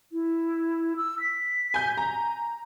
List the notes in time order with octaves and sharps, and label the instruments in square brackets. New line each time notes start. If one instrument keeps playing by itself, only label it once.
[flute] E4
E6
B6
[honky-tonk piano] G#5 G6
[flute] G#5 [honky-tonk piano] A#5